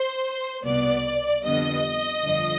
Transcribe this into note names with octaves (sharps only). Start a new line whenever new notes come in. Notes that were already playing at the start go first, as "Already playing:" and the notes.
Already playing: C5
C2 B2 B3 D5
F2 D3 G3 B3 D#5
G1 F2 D3 F3